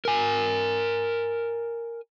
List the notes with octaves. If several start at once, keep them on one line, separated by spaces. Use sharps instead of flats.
A#4 G#5